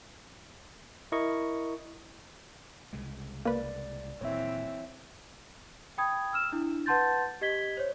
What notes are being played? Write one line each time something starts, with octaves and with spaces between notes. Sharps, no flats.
E4 A#4 D#5 C#6
C2 C#3 G#3
A#3 B4 D5
D#1 A#2 E3 F#3 C4 C#5 E5
G5 B5 D#6 G#6
E6 F6 E7
D4 E4
B4 F#5 A5 C6 G6 A6
G4 D#5 G#6 B6 G7
C5 C#5